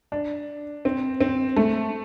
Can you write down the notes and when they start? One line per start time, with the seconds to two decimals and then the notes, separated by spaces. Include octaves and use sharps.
0.12 D4
0.85 C4
1.21 C4
1.56 A3